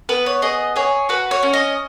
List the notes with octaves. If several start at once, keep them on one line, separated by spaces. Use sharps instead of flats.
B3 B4
C#5
G#4 D#5
G#4 C#5
F#4 B4
C#5
C#4
D#5